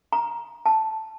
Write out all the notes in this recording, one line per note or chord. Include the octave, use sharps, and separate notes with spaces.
A#5
A5